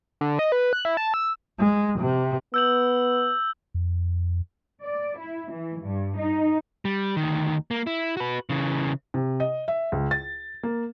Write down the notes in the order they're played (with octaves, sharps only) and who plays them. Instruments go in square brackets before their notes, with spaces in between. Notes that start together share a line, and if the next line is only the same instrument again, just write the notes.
[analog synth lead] D3
D#5
B4
F#6
E4
A5
E6
[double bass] G#3
C3
[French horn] B3 [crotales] E6 G6 F#7
[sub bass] F2
[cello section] D5
E4
E3
G2
D#4
[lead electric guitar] G3
D2 D#3
A#3
E4
F#4 B4
C#3 E3
[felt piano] C3
D#5
E5
C#2
A6
A#3